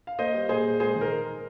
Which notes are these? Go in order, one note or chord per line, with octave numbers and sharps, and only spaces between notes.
F5
A#3 C5 D#5
G3
A#2 G#4 C5
A#2
G#3 G#4 C5
D#3
A#4